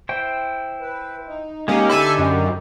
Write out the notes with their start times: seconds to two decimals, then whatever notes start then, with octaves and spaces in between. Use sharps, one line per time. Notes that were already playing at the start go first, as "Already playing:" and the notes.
0.09 E4 C5 G5
0.81 B4
1.27 D#4
1.68 G#3 A#3 C#4 D#4 G4
1.89 D3 A4 E5 G#5 B5
2.18 F#2